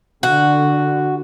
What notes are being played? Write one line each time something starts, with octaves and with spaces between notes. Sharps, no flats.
D3 F#4